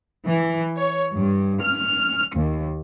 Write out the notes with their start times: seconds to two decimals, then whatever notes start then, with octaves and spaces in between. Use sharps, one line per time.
0.25 E3
0.78 C#5
1.15 G2
1.62 F6
2.35 D#2